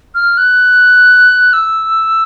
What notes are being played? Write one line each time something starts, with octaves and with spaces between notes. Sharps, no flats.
F6
F#6
E6